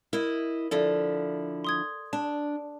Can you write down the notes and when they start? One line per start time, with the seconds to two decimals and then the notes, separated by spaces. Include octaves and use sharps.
0.13 E4 A#4 D#5
0.71 D3 F3 E4 A4 D5
1.65 C6 D#6 G#6
2.13 D4 A5